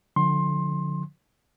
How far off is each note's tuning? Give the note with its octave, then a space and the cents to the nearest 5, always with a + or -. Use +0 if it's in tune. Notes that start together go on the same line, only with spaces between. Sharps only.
D3 +0 F3 +25 C6 +20